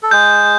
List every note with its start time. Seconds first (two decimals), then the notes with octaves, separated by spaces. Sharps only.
0.03 A4
0.11 G#3 G#4 G6